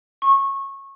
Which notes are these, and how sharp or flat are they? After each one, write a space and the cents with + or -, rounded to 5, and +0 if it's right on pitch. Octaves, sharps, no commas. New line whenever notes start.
C#6 -20